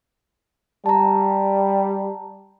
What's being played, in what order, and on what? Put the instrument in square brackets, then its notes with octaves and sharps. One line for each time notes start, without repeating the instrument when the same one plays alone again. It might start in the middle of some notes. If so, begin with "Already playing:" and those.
[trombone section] G3 [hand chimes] A5 A#5